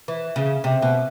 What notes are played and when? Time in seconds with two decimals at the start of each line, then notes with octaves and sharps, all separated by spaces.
0.08 E3
0.36 C#3
0.64 C3
0.82 B2